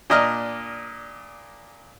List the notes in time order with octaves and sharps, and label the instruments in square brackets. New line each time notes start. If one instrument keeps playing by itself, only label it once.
[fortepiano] A#2 D4 D#5 A#5 F6